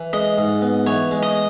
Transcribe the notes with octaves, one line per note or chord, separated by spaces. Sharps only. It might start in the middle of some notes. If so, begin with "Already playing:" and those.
Already playing: E3
G#3 D#5
G#2
B3
E3 C#5
G#3
D#5